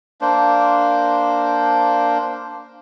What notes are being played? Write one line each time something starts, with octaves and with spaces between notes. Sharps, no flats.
A#3 D4 C5